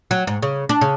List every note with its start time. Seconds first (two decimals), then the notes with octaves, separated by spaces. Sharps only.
0.11 F#3
0.27 G#2
0.43 C#3
0.69 D4
0.81 C#3